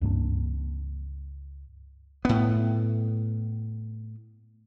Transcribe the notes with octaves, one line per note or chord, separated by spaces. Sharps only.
C#2 G2 A#3 D4
A2 B3